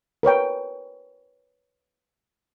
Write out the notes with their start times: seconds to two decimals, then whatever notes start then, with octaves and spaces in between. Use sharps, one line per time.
0.23 A#4 B4 C#5 G5